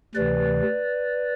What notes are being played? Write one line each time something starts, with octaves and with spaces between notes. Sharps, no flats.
D2 C3 E3 B4 D5